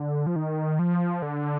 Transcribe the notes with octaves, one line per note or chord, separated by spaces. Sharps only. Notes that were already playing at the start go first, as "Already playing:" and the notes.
Already playing: D3
F3
D#3
F3
D3